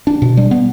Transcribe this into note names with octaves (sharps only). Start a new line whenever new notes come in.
D4
B2
G3
B3